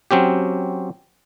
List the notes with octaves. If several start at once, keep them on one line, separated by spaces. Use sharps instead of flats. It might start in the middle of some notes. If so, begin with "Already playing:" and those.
F#3 C4 C#4 G4